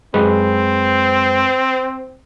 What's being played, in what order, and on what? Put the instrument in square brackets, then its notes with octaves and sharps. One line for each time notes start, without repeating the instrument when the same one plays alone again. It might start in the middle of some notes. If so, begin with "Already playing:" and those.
[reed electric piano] F#2 G#3 B4 [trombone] C4